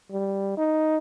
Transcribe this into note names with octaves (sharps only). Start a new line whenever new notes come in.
G3
D#4